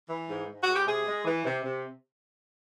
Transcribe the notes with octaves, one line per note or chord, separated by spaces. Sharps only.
E3
G#2
G#2
F#4
G#3
G4
C3 G#4
G#3
E3
C3
C3